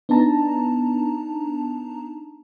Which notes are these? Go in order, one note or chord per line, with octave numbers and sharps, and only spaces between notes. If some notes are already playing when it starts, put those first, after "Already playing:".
B3 D4 D#4 A5 A#5